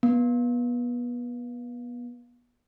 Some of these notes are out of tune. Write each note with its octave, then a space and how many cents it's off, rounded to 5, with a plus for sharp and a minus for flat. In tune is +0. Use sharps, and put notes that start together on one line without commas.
B3 -25